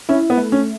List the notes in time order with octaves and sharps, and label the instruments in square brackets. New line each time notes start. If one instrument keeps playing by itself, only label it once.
[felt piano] C#4 [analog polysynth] E4
[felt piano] B3
[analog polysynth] A3
[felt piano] C#4